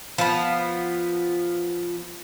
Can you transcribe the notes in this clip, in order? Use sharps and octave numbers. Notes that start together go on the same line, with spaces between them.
F3 B3